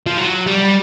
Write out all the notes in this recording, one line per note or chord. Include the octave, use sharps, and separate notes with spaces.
F3
F#3
G3